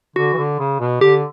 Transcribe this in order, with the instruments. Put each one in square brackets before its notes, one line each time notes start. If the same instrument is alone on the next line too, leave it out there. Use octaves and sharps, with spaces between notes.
[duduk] D3 [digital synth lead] F#4
[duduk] E3
D3
C#3
B2
[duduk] D3 [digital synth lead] G4